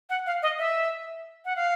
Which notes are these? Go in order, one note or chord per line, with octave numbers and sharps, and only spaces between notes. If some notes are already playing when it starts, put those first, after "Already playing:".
F#5
F5
D#5
E5
F#5
F5